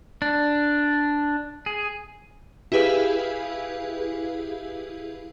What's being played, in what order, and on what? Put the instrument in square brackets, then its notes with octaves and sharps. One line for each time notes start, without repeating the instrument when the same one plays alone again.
[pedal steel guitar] D4
G#4
[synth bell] E4 G4 G#4 B4 F5